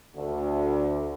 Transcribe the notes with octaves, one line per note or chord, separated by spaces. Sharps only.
D2